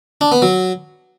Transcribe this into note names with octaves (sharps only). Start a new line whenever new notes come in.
D4
B3
F#3